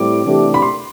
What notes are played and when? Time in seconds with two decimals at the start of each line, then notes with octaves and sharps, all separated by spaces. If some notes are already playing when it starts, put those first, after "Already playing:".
Already playing: A2 G3 C4 D6
0.25 C3 E3 A3 D4 G4
0.54 B5
0.62 C6